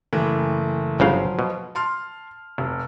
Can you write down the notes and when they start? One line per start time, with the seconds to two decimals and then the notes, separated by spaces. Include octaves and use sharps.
0.13 F#1 E3 A3
1.00 G1 C#3 F3 F#3 F5
1.39 B2
1.75 A5 C6 F6
2.58 F1